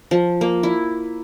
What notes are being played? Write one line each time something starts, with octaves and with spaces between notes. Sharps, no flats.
F3
A#3
E4